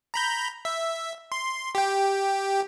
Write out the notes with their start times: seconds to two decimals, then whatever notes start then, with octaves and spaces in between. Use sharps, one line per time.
0.14 A#5 B5 G6
0.65 E5
1.32 C6
1.75 G4 G5